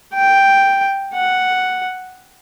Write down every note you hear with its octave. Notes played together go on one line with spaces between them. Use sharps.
G5
F#5